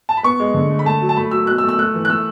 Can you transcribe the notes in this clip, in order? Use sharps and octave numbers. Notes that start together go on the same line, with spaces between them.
A5
B5
B3 C#6
G#3
D3
A3
B5
A3 A5
F#3
A5
A3 B5
F#3 E6
B2 F#6
E6
A3
E6
A3 F#6
E3
F#6
A3 E6